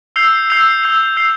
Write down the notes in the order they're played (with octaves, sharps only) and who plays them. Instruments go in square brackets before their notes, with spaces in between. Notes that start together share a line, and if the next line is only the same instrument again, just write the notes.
[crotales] E6 G6 C7 F7
E6 G6 C7 F7
E6 G6 C7 F7
E6 G6 C7 F7